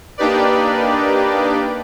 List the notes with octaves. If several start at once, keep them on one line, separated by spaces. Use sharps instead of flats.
A#3 D4 D#4 G4 B4 D5